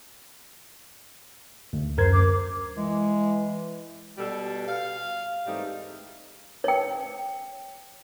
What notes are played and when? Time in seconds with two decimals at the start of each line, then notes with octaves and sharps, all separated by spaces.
1.73 D2
1.97 F#2 A#4 C5 G#6
2.12 D6
2.77 E3 G#3
4.18 B2 G3 A4
4.68 F5
5.47 G#2 E3 G3 A3 C4 D#4
6.64 C#5 G5